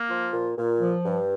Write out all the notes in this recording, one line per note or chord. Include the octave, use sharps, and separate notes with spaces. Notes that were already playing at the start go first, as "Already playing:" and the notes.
Already playing: A#3
F3 F4
A#2
A#2
F3
G2